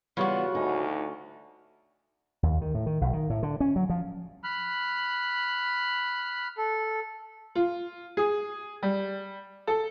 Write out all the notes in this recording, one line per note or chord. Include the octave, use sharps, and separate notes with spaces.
C#3 E3 G3 B3 F4 F#4 C#5
D2 D#4 G#5 B5 D#6
D#2
D#3
A2
D#3
B1
D#3
A2
D3
C#4
F#3
F3
B5 F6 F#6
A4
F4
G#4
G3
A4